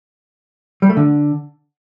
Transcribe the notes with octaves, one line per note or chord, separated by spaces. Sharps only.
G3
A3
D3